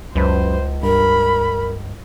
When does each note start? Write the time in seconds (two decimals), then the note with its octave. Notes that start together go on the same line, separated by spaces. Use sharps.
0.16 C#2 F#2 B4 C5
0.83 G2 A#4 B5